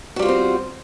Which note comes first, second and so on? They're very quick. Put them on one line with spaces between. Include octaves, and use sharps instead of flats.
F#4 G3 F4 C5 C4